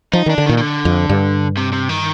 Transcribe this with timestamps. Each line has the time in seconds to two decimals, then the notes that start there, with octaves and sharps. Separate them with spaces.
0.13 F3 D#4
0.26 D#3 D4
0.38 D3
0.46 D#3
0.49 A#2
0.58 D#3
0.61 D3
0.85 F2
1.09 G2
1.57 C3
1.73 C3
1.89 D#3